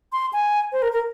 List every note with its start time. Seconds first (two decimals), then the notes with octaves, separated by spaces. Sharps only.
0.12 C6
0.33 G#5
0.72 C5
0.82 A#4
0.92 A#4